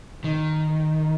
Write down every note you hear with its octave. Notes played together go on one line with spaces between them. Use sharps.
D#3